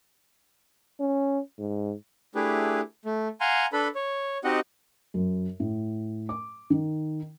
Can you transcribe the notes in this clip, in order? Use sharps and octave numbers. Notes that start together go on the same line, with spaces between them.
C#4
G#2
A3 D4 E4 G4 G#4 B4
A3
F5 F#5 G#5 A#5 C6
D4 A4 B4 B5
C#5
C4 D#4 F#4 G4 D#5 F#5
F#2
A2
D6
D#3